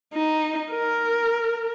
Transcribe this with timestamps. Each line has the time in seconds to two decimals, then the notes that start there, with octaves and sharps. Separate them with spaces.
0.14 D#4
0.72 A#4